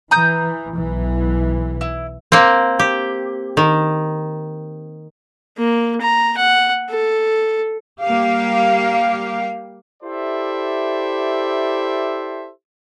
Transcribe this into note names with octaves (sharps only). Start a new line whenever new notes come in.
E3 A#5 D#6 G6
B1 E3
E4
A#3 C4
G4
D#3
A#3
A#5
F#5
A4
G3 A#3 G4 F5
E4 G4 A4 C5 D5 E5